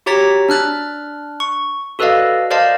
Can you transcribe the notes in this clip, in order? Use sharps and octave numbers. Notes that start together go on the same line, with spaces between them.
F#4 G4 C#5 A#5 A6 B6
D4 F6 F#6 A6
C#6
F#4 A4 B4 D5 D#5 F5
A#4 C5 D5 D#5 F5 A5